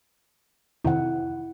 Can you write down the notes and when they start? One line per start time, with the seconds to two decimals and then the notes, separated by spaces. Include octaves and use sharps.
0.85 F2 C3 D#3 E4 F#5